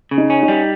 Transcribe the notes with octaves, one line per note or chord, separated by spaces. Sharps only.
C#3
D#4
C#4
D#4
G3